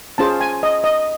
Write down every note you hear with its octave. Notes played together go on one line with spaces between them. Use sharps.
C#4 F4 G#4 C5 A5
G#5
D#5
D#5